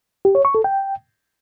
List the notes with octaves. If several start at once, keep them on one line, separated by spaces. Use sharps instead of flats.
G4
C#5
C#6
A4
G5